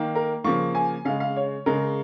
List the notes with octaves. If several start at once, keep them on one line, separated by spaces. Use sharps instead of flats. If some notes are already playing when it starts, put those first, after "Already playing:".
Already playing: D#3 A#3
A#4
C#3 F3 A#3 C#6
G#5
C#3 G#3 F5
F5
C#5
C#3 G#3 A#4